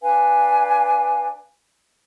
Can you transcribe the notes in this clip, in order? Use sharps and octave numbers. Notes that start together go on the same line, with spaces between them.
D4 B4 F5 G#5